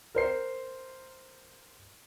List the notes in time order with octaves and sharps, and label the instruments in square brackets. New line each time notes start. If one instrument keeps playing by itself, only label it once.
[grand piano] A#4 C5 C7